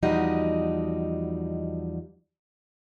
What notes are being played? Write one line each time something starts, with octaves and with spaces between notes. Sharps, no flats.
E2 F3 G3 D#4 F#4 D#5